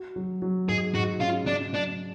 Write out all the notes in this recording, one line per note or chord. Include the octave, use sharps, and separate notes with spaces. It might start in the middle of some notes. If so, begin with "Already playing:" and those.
Already playing: F#4
F#3
F#3
G#2 G#4
G#2 F#4
C#4 F4
C#3 D4
F#3 D4